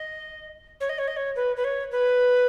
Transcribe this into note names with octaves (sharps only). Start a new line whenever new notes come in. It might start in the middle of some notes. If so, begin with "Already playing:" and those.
Already playing: D#5
C#5
D#5
C#5
D#5
C#5
B4
B4
C#5
B4